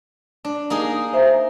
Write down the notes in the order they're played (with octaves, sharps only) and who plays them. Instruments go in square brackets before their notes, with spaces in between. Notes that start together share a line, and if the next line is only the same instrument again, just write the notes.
[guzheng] D4
A#3 D#4 G#4
[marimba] C5 E5 A#5